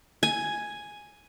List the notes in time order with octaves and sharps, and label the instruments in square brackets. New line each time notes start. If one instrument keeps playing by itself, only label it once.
[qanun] G#5